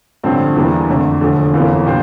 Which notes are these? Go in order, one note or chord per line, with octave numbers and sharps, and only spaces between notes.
A1 G2 D3 F3 C4
E2 E3 G3 A#3 D4
F2 D3 A3
E1 E2 D3 F3 A3
G1 F2 E3 A#3
A#2 G3 D4 F4 C5